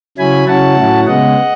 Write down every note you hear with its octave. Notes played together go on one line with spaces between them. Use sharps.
C#3 F#3 C#4 E4 G#5 B5
C#3 F#3 C#4 E4 F#5 A5
A2 F#3 C#4 E4
C#3 G#3 B3 D#5 F#5